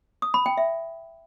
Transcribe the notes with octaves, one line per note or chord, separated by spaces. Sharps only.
D#6
B5
G5
E5